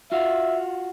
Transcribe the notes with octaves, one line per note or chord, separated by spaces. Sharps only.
F4 F#4 E5 F5